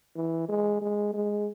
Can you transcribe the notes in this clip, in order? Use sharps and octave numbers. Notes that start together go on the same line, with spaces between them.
E3
G#3
G#3
G#3